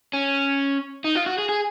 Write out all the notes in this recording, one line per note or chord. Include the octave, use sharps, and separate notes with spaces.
C#4
D#4
F4
F#4
G#4
G#4